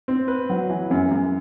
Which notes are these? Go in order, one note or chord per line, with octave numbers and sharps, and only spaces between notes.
C4
B4
F#3
E3
F#2
F#2